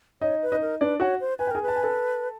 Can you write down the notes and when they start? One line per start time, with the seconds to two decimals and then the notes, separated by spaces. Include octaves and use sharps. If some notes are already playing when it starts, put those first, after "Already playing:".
0.21 D#4 C#5 D#5
0.42 B4
0.52 D#4 D#5
0.62 A#4
0.81 D4 B4 D5
1.00 F#4 C#5 F#5
1.20 C5
1.39 B4 G#5
1.47 G5
1.51 G#4 A#4 G#5
1.62 B4
1.68 A5
1.76 G#5
1.83 A4 A5